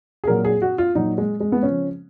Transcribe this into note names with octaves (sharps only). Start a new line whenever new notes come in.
G#4
A#2 F#3 A#4
G#4
F#4
F4
A#2 F#3 D#4
G#3
G#3
B3
C#3 F3 C#4